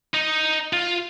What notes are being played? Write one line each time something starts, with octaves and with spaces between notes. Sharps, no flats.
D#4
F4